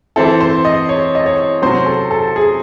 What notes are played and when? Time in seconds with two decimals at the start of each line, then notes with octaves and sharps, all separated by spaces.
0.16 E3 C4 E4 A4
0.41 C5
0.65 D#5
0.89 C#5
1.15 D#5
1.26 C#5
1.62 C3 F#3 C#4 C5
1.86 A4
2.11 A4
2.36 G#4